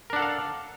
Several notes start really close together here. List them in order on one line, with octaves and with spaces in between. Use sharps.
A#4 D4 F#5 A4 F5